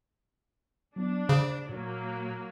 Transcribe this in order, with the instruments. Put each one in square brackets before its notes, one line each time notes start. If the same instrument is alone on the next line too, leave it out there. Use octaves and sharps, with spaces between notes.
[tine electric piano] F#3 B3 [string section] D4
[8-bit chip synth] C#3 [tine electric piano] C5
[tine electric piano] A#2 [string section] F#3 A#3